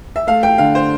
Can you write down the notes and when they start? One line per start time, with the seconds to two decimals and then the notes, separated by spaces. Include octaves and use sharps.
0.16 E5
0.27 A3 F5
0.43 G5
0.58 D3 F5
0.75 C5